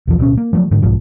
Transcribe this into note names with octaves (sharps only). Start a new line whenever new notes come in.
B1 E2 F3
D1 B2 C#4
A#3
F3 F#3 A3
G#2 D3
B1 G#2 F3